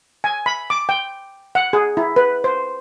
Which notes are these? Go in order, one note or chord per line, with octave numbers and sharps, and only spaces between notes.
G#5
B5
D6
G5
F#5
G#4
E4
B4
C5